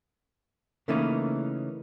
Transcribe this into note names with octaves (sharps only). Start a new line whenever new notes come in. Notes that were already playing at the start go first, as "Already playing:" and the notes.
C#3 E3 A3 A#3 C#4 D#4